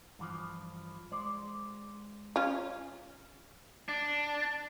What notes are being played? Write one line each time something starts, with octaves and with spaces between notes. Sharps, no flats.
G2 E3 F3
G#3 C5 D5
C#4 F4
D4